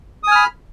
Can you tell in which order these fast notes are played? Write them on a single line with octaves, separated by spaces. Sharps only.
D#6 G#5 F6 B5